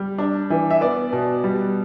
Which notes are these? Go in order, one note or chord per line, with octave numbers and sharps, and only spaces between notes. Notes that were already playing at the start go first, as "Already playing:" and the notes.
Already playing: G3
D4
E3
E5
B3 D5
B2
G3